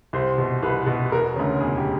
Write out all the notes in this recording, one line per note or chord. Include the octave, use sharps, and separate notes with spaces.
C2 C5
B2
C2 B4
B2
E1 A#4
D2 C#3
E1 G#4
G4